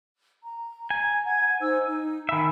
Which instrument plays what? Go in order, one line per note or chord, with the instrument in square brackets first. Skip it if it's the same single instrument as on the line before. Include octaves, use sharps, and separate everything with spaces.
[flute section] A#5
[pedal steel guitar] G#5
[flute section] F#5 G#6
D#4 C5 E6
D#4
[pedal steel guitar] D#3 E5 [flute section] G#5 B5